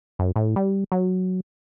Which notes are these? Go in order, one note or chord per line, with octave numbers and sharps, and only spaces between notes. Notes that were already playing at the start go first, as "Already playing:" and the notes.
F#2
A2
G3
F#3